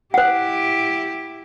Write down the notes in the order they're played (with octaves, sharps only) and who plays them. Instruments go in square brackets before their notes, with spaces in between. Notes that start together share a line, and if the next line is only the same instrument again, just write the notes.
[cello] E4 G4 [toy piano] C5 F#5